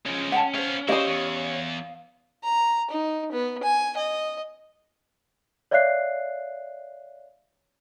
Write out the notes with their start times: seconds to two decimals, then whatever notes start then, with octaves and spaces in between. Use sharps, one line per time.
0.06 C#3 F3 G#3 C#4
0.32 C#4 F#5 G5 A5
0.54 B3 C5 C#5 F5
0.89 C#4 E4 G4 C5 C#5 D#5 F5 D#6
1.07 E2
2.43 A#5
2.90 D#4
3.32 B3
3.63 G#5
3.97 D#5
5.71 C#5 D5 E5 F5 F#6 C7